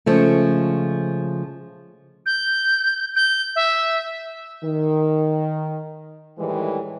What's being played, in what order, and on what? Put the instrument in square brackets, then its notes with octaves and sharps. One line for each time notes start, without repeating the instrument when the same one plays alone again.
[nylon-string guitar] C#3 F3 G#3 A3
[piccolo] G6
G6
E5
[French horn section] D#3
A2 D#3 E3 G3 G#3